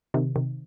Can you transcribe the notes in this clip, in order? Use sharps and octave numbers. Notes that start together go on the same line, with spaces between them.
C3 D#3
C3 D#3